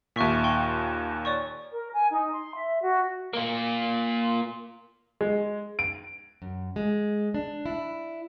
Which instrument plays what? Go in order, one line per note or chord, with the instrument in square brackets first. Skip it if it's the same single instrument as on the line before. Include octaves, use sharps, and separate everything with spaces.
[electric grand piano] D#2 A#2 [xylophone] E5 C#6 B6
[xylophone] G5 C6 C#6
C#5 D5 C#6
[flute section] A#4
G#5
D#4
C6
E5
F#4
[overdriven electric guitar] A#3 F4
[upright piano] G#3
D7
[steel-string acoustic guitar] F#2
G#3
D4
E4